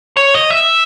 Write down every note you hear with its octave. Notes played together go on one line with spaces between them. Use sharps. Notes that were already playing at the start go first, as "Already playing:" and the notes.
C#5
D#5
E5